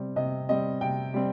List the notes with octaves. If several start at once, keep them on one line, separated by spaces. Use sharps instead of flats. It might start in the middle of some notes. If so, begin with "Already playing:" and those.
Already playing: C3 G3 C4
C3 D#5
G3 C4 D#5
C3 G5
G3 C4